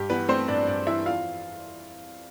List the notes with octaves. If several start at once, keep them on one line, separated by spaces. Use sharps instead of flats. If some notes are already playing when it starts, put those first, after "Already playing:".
Already playing: G2 G4
E3 B3 B4
A3 C4 C5
G2 D4 D5
G2 D4 D5
E3 E4 E5
F2 F4 F5